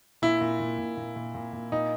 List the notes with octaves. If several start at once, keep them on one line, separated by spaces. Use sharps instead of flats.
A#2 E4
A#2
A#2
A#2
A#2
A#2
A#2
A#2
A#2 D#4